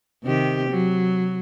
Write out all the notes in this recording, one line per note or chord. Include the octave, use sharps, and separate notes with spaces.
C3 D#3 G4
F#3